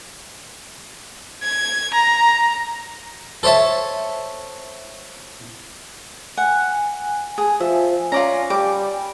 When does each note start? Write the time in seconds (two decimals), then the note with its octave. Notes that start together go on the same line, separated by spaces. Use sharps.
1.42 G#6
1.94 A#5
3.43 A4 C5 C#5 E5 A5
6.37 F#5 G#5
7.38 G#4
7.60 F3 E5
8.12 C#4 F4 D5 A#5
8.50 G3 D6